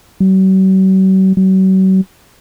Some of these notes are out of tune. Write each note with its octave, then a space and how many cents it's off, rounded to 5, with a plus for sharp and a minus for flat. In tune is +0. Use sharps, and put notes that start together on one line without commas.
F#3 +45
F#3 +40